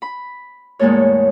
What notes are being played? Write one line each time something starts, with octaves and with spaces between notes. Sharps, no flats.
B5
E2 A2 G#3 A#3 A4 C#5